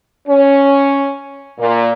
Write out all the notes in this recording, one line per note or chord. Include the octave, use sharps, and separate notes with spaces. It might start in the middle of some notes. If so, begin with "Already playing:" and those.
C#4
A#2